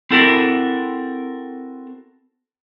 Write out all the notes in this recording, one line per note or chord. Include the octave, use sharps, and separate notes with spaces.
C4 E4 F#4 A4 A#4